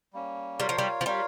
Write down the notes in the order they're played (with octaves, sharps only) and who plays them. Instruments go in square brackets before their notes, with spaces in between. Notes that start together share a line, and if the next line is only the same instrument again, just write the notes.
[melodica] G3 A#3 C#4
[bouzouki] G3 [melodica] F4 A#4 C#5 F5
[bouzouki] F3
G3
F3
[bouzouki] G3 [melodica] F4 A#4 C#5 F5